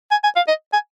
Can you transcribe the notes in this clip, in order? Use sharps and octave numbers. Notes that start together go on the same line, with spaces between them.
G#5
G#5
F5
D#5
G#5